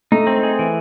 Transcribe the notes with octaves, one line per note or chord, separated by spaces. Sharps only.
A3 D#4
C4
G#4
E3